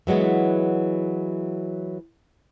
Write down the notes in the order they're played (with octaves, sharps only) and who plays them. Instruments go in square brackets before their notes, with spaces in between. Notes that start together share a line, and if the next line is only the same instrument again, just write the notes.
[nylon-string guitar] E3 F#3 G#3 B3